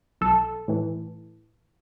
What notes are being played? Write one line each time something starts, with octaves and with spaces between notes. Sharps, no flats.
B1 A4
A2 E3